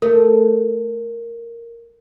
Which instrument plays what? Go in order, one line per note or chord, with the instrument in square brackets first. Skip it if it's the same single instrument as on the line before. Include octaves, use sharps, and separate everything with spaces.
[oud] A3 [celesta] A#4